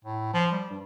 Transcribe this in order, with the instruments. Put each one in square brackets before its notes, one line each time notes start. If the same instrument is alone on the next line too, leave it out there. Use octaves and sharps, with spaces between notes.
[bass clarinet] A2
F3
G3
G2